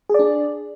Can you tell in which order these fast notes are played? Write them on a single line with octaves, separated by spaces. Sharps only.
G#4 D5 D4